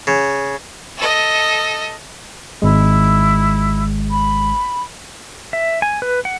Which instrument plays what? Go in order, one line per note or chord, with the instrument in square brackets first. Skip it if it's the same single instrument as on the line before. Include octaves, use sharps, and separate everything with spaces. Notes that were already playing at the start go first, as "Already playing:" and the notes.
[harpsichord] C#3
[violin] A4 D#5
[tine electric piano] G#1 G#3 [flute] E4
[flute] B5
[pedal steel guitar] E5
G#5
B4
F#5